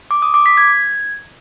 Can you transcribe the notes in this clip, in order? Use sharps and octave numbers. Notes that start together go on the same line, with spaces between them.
D6
D#6
D6
B6
G#6